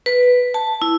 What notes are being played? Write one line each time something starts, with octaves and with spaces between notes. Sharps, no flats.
B4
A5
E4